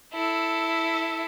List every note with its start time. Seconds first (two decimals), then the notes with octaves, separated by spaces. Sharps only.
0.14 E4 A4